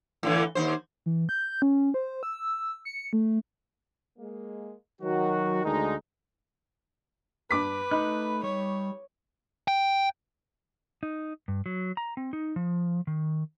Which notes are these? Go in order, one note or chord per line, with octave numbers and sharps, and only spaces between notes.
A2 D3 E3
D#2 G#2 C5
E3
G6
C#4
C5
E6
C#7
A3
G#3 A#3
D#3 F#3 F#4
D2 G#3 D#4
G2 B4 D6 B6
A3 D#4 B5 F#6
G3 C#5 C#6
G5
D#4
G2
F#3
A#5
C4
D#4
F3
D#3